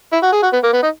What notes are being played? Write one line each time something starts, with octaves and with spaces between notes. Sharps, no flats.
E4
F#4
G#4
F#4
B3
A#3
B3
D#4